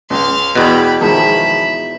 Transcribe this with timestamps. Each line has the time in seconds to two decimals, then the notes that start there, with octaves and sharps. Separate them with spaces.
0.10 C#2 F5 C6
0.55 E2 B2 G5 B5
1.01 D#3 F3 G#3 E5 B5